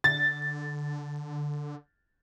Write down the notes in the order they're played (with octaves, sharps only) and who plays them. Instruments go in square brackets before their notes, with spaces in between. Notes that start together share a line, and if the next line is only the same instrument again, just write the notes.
[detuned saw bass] D3 [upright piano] A6